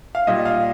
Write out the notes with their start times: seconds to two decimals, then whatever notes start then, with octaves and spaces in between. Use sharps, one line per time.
0.15 F5
0.27 A#2 G3 D#5
0.45 F5